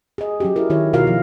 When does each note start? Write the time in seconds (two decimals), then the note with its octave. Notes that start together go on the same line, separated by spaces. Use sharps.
0.18 G#4 D#5
0.40 F#3 C#4 G4
0.56 E4 A#4
0.70 D#3 E4 C#5
0.93 B2 F4 F#4 A#4 F5
1.07 F3